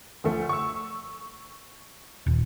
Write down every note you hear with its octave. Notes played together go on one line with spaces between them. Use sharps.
D2 F3 A3
C#6 E6
D#1